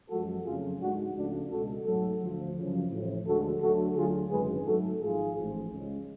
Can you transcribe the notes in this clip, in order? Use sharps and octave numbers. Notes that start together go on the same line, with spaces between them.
F#2 F3 G#3 F#4 A4
F2 C#3 F#3 A3 F4 G#4
G#2 G#3 D4 F#4
C#2 C#3 F3 A3 D4 F#4
C#2 B2 G#3 F#4 A4
G#2 F#3 A3 F#4 A4
D2 D3 F3
F#2 C#3 F3
A1 A2 F3
D2 D3 F3 G#3 F#4 A4
D2 D3 F#3 A3 F#4 A4
D2 D3 F#3 A3 F4 G#4
G#1 F#2 C#3 G#3 G#4 B4
G#2 F#3 A3 F#4 A4
G#1 G#2 F3 F4 G#4
A1 G#2 F3
C#2 C#3 G#3